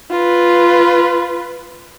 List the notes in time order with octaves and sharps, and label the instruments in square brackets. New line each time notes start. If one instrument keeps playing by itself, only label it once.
[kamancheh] F4 B4